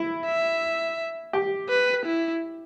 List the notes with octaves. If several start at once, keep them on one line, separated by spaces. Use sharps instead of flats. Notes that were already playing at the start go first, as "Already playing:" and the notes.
Already playing: E4
E5
G4
B4
E4